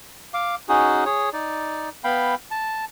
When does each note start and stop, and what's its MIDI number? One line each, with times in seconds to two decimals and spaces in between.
0.34 0.55 77
0.34 0.55 86
0.69 1.04 61
0.69 1.04 63
0.69 1.04 66
0.69 1.04 68
1.06 1.29 68
1.06 1.29 73
1.33 1.89 63
1.33 1.89 74
2.04 2.35 59
2.04 2.35 77
2.04 2.35 79
2.04 2.35 83
2.51 2.85 81